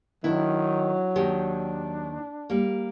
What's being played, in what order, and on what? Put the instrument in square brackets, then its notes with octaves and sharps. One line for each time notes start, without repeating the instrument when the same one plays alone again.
[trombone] D#3 [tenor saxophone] F#3 [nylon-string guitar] D4 E4
[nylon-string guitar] D#2 D#3 G4 [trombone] D4
[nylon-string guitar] G3 A#3